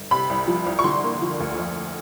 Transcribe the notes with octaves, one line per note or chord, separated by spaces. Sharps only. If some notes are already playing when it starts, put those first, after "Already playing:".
Already playing: G1
C3 B5
C2
F3
C2
C#6
D3 C6
A#3
F3
D2
F2